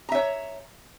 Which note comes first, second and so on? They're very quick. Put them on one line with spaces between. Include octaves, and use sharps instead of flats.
A#5 E5 C#5